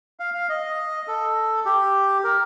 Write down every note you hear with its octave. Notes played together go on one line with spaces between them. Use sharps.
F5
F5
D#5
A4
G4
A#4